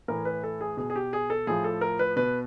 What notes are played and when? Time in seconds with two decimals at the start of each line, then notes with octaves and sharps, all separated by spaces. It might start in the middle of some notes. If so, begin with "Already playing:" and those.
0.08 A2 E3 A#4
0.25 B4
0.43 A4
0.61 G#4
0.77 B2 G#4
0.90 G#4
0.96 G4
1.13 G#4
1.30 A4
1.47 A2 F3 G#4
1.64 A4
1.81 A#4
1.99 B4
2.16 B2 B4